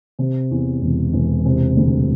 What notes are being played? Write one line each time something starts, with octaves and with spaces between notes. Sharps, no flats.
C3
E2
E1
E1
C3
D2